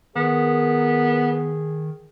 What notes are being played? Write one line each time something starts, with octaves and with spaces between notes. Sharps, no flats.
D#3 B3 G#4 A#4